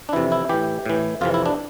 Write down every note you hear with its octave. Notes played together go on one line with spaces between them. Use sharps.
D4
F2 C3 E3 E4
E4
A2 E3 G4
A2 E3
F2 C3 E3 F4
E4
D4